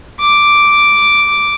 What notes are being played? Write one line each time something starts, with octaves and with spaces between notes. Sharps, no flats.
D6